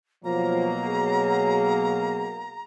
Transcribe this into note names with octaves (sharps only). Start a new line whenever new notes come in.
B2 F3 F#3 A#3 A#5
G#4